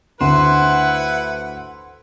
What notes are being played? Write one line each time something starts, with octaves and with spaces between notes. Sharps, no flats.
D2 E4 B4 C5 F#5